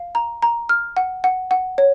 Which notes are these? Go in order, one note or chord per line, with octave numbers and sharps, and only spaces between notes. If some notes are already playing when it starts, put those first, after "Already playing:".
Already playing: F5
A#5
A#5
F6
F#5
F#5
F#5
C#5